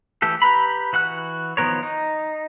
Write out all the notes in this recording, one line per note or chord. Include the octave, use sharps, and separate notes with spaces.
E3 A3 G4 A4
G4 B4 A#5 B5
E3 F#4 F#5 F#6
D#3 F3 B3 A#4 C#5
D#4